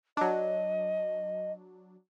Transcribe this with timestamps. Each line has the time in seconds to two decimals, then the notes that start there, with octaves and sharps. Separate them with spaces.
0.17 F#3 D4 D#5